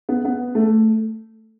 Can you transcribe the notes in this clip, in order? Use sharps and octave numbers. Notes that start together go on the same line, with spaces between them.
B3
B3
A3